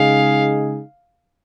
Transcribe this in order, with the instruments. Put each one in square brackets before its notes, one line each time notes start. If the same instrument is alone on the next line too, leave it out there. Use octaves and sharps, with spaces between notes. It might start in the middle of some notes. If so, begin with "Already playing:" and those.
Already playing: [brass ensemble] C#3 G#3 D#4 G#4 [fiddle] F5